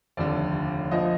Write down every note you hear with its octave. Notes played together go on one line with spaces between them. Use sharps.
F1 D#2 D3 D5
A#1 A#2 F3 D#5